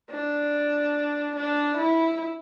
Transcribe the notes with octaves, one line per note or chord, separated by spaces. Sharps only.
D4
D4
E4